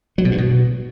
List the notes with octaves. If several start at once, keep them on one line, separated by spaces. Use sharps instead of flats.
F#3
B2
G2
B2